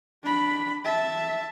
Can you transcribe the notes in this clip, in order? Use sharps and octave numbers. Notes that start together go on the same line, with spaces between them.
D4 B5
E5 A5